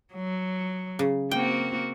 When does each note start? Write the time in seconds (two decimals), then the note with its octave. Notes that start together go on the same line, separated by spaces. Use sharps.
0.14 F#3
0.99 C#3
1.31 A#3 C4 F#4 G5